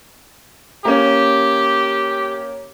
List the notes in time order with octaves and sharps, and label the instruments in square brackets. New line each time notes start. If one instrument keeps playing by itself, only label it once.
[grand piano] A#3 C#4 [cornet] G4